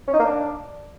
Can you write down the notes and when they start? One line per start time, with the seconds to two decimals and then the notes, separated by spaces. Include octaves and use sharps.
0.08 C#4
0.14 D#4
0.19 A#3
0.25 D4